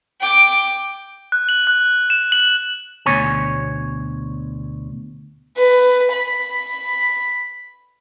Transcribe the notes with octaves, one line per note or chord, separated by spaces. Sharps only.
G5 D6
F#6
F#7
F#6
E7
F#7
D2 B2 C#5 G#5
B4
B5